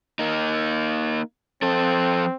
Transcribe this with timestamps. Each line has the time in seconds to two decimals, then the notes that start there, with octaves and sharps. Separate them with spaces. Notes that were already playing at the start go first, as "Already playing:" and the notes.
0.19 A#3 D#4
1.62 F3 C4 A4